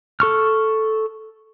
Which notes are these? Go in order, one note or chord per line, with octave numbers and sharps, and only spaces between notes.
A4 C#6 F6